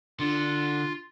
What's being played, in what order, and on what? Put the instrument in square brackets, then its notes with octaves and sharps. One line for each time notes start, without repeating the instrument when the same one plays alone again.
[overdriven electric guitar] D3 [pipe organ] F4